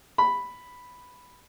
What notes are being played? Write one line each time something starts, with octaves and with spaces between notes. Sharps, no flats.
B5